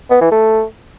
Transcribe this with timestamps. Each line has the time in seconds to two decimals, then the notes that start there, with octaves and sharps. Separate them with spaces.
0.10 B3
0.21 E3
0.32 A3